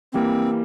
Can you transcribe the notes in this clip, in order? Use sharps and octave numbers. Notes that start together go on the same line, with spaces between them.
E3 G3 A#3 C4